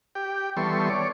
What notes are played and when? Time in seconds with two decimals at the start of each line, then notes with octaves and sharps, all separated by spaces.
0.15 G4 G5
0.57 E3 G3 B3 A4 C6 C#6
0.90 C#5 D5